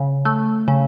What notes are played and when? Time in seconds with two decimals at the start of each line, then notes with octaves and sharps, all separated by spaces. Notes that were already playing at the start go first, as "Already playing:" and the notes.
Already playing: C#3
0.25 A3
0.68 C#3